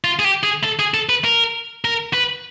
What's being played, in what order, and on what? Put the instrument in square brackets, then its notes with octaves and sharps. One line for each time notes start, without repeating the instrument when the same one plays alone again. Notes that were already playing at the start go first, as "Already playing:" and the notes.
[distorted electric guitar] F4
G#4
G4
G#4
A4
G#4
A4
B4
A#4
A#4
B4